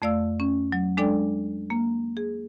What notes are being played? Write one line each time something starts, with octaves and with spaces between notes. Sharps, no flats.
F2 A3 D5 F5 E6
C#4
F#3
G#3 D4 A4 D5 G5
A#3
G#4